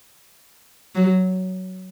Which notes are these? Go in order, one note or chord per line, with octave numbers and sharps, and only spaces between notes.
F#3